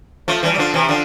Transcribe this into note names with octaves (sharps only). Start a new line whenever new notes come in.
F3 A3
E3 G3
G3
D3 F3
C3 E3
D3 F3